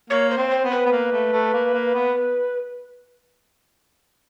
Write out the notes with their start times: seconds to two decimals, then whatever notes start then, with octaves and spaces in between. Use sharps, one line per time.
0.10 A#3 C#5
0.30 C5
0.37 C4
0.51 C5
0.65 B3
0.71 B4
0.86 B3
0.92 A#3
1.12 A3
1.33 A3
1.53 A#3
1.73 A#3
1.94 B3